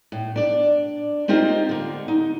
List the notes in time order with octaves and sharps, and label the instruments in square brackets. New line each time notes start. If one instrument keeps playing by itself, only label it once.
[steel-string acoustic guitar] A2
D4 D5
A#3 C4 D#4 F4 G4
D3 A#3
D#4